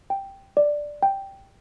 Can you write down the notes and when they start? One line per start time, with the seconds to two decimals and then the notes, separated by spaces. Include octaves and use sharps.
0.10 G5
0.57 D5
1.03 G5